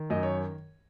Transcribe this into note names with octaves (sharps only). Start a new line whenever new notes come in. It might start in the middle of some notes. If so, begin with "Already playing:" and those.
Already playing: D#3
F#2 D#5
C#5